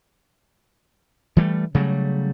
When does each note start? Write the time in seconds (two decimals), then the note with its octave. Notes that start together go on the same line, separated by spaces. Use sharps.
1.37 E3 G3 A3
1.74 C#3 F#3 G3 A3